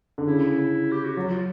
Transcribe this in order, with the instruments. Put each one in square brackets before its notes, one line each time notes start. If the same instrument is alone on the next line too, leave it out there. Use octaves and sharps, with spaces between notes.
[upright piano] D3
[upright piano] C#3 [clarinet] E4
[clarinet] G4
F#4
[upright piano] F#3 [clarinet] F4
[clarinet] F#4
F4